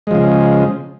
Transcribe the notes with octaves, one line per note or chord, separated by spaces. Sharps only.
C#3 F3 G#3